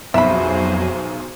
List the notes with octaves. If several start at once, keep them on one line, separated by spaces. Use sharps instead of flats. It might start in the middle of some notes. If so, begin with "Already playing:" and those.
B1 F2 F#3 F#4 G#4 C5 E5 B5